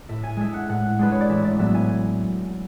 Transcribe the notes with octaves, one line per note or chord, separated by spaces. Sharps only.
A2 E5
G#5
G#3 D4 E5
F#5
A2 F#5
G#3 D4 B4
C#5
D5
A1 E5
D5
A2 F#3 B3 E5
G#5